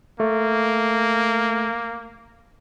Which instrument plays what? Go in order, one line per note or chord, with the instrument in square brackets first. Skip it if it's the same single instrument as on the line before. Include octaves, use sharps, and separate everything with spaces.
[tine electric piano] A3 [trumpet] A#3